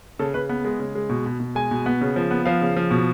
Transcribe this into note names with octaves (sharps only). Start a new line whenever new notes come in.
C#3 A4
C#3 B4
B3
G#3
C#3
G#3
B2
B2
B2
G#3 G#5
B2
B3
C#3
F3
B3
F3 F5
C#3
F3
B2